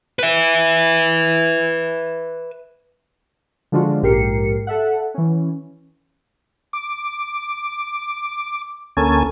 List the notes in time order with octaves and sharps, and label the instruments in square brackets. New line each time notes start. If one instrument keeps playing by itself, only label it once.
[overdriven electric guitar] B4 E5
[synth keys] D3 F3 G#3 D4 F4 F#4
A#1 G#2 G4 A#4 C7 C#7
A4 E5 F#5
E3 C#4
[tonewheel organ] D6
D2 A#3 C#4 A4 G#5